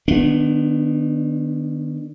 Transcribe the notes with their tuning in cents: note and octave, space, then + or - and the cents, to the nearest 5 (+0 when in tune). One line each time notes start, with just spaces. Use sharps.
D#3 -25 B3 +0 D4 +0